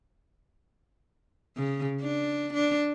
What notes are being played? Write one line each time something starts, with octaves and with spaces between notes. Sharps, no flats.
C#3
D4
D4